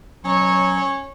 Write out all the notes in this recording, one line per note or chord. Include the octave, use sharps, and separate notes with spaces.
F#3 C#4 C#5